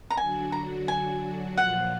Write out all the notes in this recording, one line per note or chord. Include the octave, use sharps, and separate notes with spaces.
A#5
D3 F#3 D4 F#4 G#5
A#5
D3 F#3 D4 F#4 G#5
A#2 F3 A#3 F4 F#5